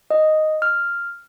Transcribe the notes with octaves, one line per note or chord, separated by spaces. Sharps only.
D#5
F6